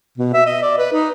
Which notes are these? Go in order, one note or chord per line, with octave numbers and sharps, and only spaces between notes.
B2
E5
D#5
D5
B4
D#4